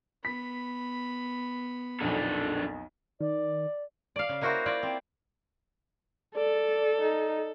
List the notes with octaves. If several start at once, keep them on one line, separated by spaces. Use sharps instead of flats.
B3 B5 B6
B1 F2 A#2 D4 A4
D#3 D5
D5 F5
C#3
A#3 E4 F#4 A#4 C5
E4 F4 D5
C4
A4 D5
D#4